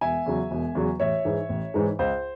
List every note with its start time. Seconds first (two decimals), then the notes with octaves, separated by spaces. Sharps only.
0.01 E1 E5 G#5
0.26 E2 C#3 F#3
0.51 E1
0.75 E2 C#3 F#3
1.00 A1 C#5 E5
1.25 G#2 E3 G#3
1.49 A1
1.74 G#2 E3 G#3
1.99 C#2 C5